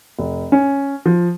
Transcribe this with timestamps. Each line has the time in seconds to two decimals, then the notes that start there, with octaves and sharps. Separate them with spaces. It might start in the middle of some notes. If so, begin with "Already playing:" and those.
0.19 F1
0.52 C#4
1.06 F3